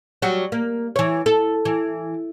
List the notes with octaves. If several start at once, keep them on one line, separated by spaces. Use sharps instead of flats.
F#3 G3 F#4
A#3
E3 C#5
A4
E3